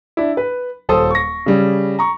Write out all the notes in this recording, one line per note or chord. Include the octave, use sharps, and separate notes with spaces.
D4 E4
B4
D#1 A4 C5 D#6
C#6 A#6
C#3 G3 C#4
A#5 C#6